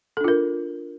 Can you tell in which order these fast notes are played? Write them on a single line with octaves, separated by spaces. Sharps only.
A4 D4 F4 A#4